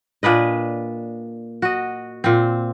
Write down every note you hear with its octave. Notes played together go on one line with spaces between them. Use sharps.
A#2 D4 B4 D#5
F#4 D#5
A#2 C4